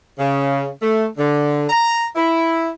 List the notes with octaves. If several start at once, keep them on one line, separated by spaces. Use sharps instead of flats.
C#3
A3
D3
A#5
E4